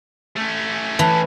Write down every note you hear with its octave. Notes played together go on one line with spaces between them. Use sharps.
A3 C#4
E3 A5